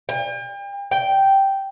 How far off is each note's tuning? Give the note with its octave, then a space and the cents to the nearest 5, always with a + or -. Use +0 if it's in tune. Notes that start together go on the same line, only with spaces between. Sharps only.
G5 +40
G5 -5